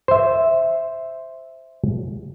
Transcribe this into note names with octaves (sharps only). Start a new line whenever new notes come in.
C5 E5